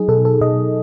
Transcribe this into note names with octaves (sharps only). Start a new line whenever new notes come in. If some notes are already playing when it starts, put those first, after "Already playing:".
Already playing: F#3 D#4 G#4
B2 A4
A4
B2 D#5